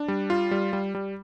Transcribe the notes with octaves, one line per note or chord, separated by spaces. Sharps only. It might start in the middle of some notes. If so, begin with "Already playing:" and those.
Already playing: D4
G3
F4
G3
G3
G3